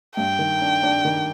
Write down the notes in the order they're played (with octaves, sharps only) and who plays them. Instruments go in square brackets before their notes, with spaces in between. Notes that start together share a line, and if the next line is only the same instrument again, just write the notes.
[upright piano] G2 [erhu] G5
[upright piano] D#3
D4
D4
D#3